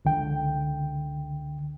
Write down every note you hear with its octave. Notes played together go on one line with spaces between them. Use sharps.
C#2 D3 G5